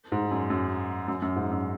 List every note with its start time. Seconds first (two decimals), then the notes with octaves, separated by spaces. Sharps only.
0.12 G#2
0.31 F#2
0.50 F#2
1.08 F#2
1.22 F#2
1.36 G#2
1.51 F#2